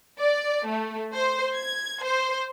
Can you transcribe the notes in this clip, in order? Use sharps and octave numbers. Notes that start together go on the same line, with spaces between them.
D5
A3
C5
G#6
C5